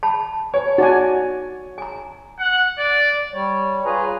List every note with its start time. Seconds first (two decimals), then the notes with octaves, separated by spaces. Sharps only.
0.03 A5 B5
0.54 C#5 G#5
0.78 D#4 F#4 D5 G#5
1.78 G#5 A#5
2.39 F#5
2.79 D5
3.33 G3 C#5
3.85 F4 G#4 B4 C#5 G#5 A#5